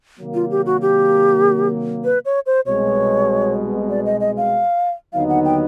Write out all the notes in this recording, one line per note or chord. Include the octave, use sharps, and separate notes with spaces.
C3 D#3 F#3 A#3
F4
G4
F#4
G4
B4
C#5
C5
C2 B2 G#3 C#5
D5
D#5
D#5
F5
D#2 D3 F#3 B3 D#4 F5
F#5
G5